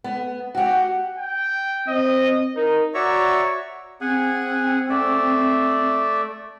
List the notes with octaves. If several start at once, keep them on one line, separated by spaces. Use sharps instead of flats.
B3
F#4 G4 F#5
G5
C4 D#5
D#4 A#4
F#4 C#5 D5 E5 A#5 C#6
C4 G#4 F#5 G#5
A3 D5 E5